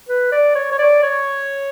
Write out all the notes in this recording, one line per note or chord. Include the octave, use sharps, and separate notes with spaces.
B4
D5
C#5
C#5
D5
C#5